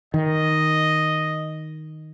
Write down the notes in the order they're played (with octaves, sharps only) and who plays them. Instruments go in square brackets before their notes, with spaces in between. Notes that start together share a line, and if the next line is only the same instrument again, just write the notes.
[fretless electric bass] D#3 [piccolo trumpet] D#5